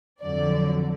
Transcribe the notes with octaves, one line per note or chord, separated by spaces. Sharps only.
F2 D3 F#3 D5